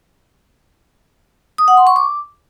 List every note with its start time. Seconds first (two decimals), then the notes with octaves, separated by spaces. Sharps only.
1.58 D#6
1.68 F#5
1.77 C6
1.87 C#6
1.96 D6